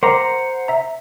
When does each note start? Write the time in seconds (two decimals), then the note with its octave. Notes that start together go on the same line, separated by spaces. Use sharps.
0.03 A#4 C5 F#5 A#5 C6 D6
0.68 E5 A#5